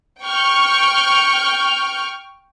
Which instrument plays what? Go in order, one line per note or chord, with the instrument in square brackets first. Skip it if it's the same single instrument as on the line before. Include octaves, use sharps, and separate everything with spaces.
[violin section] G5 C#6 F6 G6